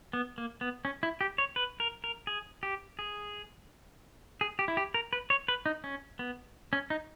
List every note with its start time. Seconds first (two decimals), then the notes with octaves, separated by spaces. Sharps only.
0.13 B3
0.38 A#3
0.61 B3
0.85 C#4
1.03 E4
1.21 G4
1.38 C#5
1.56 B4
1.80 A#4
2.04 A#4
2.27 G#4
2.63 G4
2.99 G#4
4.41 G#4
4.59 G4
4.68 E4
4.77 G4
4.94 A#4
5.13 B4
5.30 C#5
5.48 B4
5.66 D#4
5.84 C#4
6.19 B3
6.73 C#4
6.90 D#4